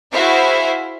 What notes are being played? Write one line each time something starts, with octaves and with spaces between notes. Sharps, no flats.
E4 F#4 G#4 C5 E5 F5